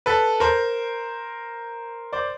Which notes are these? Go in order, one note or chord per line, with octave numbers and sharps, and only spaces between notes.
A4 B4
A#4 C5
C5 D5